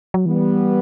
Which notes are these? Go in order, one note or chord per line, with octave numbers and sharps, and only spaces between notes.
F#3
E3 G3 B3